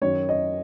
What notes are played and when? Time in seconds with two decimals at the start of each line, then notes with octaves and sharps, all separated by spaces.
0.02 F#2 D#3 F#3 C#5
0.29 D#5